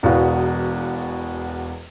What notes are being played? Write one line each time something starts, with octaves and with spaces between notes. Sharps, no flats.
E1 E2 B2 B3 F#4 F5